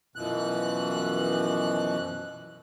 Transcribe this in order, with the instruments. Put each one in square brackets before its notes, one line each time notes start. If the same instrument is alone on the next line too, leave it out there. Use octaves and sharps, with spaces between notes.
[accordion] F#2 B2 E3 F3 F#6